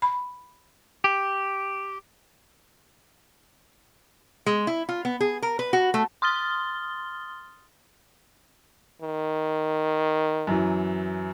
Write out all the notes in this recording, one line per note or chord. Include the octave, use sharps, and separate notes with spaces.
B5
G4
G#3
E4
F4
B3
G#4
A#4
B4
F#4
A3
C6 D#6 F6 A6 G7
D#3
F#2 E3 F#3